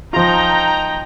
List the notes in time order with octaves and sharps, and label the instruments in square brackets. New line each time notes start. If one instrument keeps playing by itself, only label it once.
[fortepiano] F3 F4 [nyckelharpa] D#4 G5 [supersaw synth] A#5